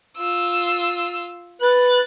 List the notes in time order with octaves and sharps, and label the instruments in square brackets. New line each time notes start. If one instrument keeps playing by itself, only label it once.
[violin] F4 E6
[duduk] B4 [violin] F#6 A6